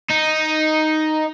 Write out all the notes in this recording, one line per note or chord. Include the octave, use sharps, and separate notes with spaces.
D#4